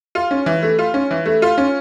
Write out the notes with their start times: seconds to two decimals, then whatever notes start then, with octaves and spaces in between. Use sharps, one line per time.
0.15 F4
0.31 C#4
0.46 E3
0.63 A3
0.79 F4
0.94 C#4
1.11 E3
1.26 A3
1.42 F4
1.58 C#4